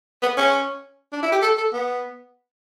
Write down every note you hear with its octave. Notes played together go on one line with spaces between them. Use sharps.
B3
C#4
D4
E4
G4
A4
A4
B3